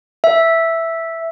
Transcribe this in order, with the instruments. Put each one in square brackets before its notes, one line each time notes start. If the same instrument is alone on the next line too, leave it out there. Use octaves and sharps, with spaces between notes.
[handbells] E5